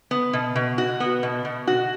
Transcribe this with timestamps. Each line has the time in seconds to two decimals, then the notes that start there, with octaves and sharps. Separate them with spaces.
0.11 B3
0.33 B2
0.56 B2
0.78 F#4
1.00 B3
1.23 B2
1.45 B2
1.67 F#4